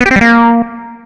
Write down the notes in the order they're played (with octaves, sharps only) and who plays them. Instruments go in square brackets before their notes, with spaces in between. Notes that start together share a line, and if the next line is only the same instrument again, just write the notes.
[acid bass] B3
G4
C4
G3
A#3